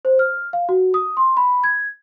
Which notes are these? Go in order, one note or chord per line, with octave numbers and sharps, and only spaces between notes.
C5
F6
F5
F#4
D#6
C6
B5
G#6